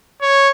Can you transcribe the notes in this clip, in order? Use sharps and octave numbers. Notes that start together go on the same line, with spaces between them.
C#5